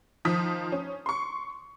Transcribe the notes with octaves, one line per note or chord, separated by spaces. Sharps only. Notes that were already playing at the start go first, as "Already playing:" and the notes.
D#3 F3 D#6 B6
C#4
C6 C#6